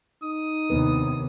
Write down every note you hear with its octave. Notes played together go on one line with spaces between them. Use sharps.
D#4 D#6
D#2 C3 B3 D4 B4